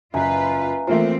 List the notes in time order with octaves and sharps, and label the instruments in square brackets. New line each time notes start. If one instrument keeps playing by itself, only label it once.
[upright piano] F#1 [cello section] F4 B4 [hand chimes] E5 G#5 A#5
[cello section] E3 F3 C4 [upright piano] A3 A#3 F4 [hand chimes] C5